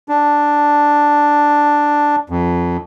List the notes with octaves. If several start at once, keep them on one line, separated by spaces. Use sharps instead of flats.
D4
F2